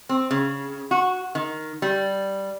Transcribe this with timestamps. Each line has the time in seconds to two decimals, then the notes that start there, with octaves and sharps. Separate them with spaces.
0.09 C4
0.31 C#3
0.91 F#4
1.35 D#3
1.82 G3